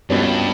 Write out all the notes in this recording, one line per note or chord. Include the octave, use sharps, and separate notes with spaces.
C#2 G2 B2 A#3 C#4 G4